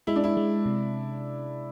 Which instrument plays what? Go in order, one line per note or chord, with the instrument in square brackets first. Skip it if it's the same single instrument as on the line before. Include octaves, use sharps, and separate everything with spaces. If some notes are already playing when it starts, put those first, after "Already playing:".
[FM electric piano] G#3 [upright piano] E4
[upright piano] D4
E4
[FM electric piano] G#3
C3